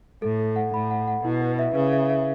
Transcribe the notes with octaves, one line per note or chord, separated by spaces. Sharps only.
A2 A4
A4
F#5
A2 B5
F#5
F#5
B2 E4
B4
E5
C#3 B4
E5
E5